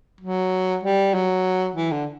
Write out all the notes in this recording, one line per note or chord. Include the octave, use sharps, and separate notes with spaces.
F#3
G3
F#3
E3
D3